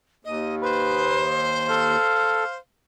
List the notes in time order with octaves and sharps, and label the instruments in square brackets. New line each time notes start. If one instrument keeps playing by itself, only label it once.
[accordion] D#2 [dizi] D#5
[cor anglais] B4 [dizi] C5
[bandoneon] A4 [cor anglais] F5